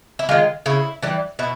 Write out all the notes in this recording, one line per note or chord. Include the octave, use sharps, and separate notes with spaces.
E4
D#3 G#3 F4
C#3 E4
E3 G3
B2 E4